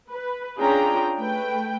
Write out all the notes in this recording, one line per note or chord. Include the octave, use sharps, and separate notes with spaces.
B4
C#4 D4 F4 G#4 G5 A#5
A3 B4 G5